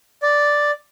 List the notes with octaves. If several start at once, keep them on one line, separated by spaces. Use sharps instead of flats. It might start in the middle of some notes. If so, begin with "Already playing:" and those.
D5